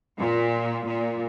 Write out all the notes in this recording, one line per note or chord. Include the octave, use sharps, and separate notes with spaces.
A#2
A#2